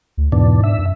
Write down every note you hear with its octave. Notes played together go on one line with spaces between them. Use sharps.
D2
E2 G#2 B2 D4
E5
F#2